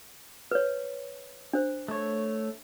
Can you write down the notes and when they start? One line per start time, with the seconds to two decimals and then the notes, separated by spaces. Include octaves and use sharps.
0.51 B4 C#5
1.53 D4 C5
1.88 A3 C#5